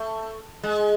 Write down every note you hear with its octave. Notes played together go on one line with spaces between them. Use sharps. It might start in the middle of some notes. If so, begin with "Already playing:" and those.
Already playing: A3
G#3